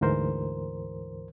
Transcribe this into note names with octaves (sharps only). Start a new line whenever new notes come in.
D2 G#2 E3 A#4 C5